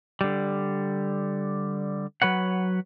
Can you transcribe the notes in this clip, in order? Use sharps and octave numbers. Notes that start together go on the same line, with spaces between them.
D3 G3
F#3 B4 C#5 F#5